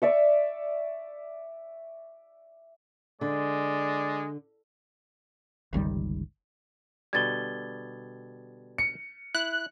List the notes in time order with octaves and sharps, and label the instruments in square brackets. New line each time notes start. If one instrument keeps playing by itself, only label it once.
[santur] D5 E5 C#6
[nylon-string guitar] D3 [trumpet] G#3 [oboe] D5
[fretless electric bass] G1 C#2 D#3 G3
[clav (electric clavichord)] B2 D3 G3 [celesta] G#6 A6 G7
[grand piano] C#7
[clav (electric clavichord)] E4 [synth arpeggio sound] F#6